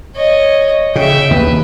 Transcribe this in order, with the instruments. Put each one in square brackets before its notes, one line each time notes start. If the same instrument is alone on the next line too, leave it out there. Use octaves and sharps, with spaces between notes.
[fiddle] C#5 D#5
[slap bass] C#3 [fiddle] E5 G5
[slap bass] D#2 [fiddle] B4